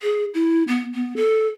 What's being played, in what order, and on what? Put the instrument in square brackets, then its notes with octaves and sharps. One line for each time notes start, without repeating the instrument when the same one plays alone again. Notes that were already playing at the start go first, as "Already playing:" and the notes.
[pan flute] G#4
E4
B3
B3
A4